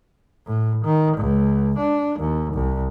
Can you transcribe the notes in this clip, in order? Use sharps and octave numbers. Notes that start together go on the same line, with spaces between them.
A2
D#3
C#2
D4
D#2
C2